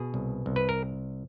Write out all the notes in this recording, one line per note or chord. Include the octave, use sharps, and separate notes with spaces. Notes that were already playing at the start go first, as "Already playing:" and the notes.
Already playing: B2 G#4
C2
C2
B4
A#4